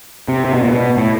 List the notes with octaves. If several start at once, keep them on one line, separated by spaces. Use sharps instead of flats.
C3
C3
B2
A#2
B2
A2